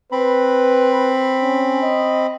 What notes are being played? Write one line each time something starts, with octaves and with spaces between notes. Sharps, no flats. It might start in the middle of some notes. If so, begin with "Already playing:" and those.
C4 B4 B5
C#4
D#5